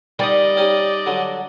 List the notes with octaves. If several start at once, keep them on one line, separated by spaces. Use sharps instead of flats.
D#3 G3 D5 D#5 D#6
C#4 D#4 G4
D3 F#3